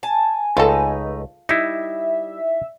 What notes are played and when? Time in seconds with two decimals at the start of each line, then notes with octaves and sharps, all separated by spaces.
0.03 G#5 A5
0.57 C#2 A3 D#4 F4 A4 B4
1.49 G3 D#4 E4 E5